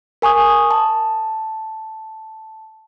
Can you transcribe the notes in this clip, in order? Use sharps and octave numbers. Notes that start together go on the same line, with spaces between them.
A#4 G#5 C#6 D#6
A5